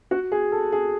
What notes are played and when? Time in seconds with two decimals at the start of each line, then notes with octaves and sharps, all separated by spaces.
0.11 F#4
0.32 G#4
0.52 A4
0.72 G#4